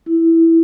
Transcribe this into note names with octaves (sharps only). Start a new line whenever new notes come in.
E4